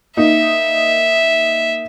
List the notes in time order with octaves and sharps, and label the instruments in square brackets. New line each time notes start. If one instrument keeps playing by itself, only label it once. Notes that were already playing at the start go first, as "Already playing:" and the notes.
[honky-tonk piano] A#3 D#4 [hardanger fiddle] E5